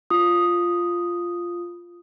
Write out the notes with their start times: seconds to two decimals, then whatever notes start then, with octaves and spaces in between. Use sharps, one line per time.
0.10 F4 D#6